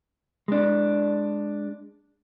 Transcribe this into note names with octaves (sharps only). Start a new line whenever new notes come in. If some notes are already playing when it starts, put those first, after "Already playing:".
G#3 D4